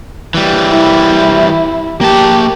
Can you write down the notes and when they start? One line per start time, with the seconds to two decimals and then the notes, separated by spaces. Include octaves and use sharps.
0.34 E3 G3
0.71 E4
2.01 A#3 G4 A5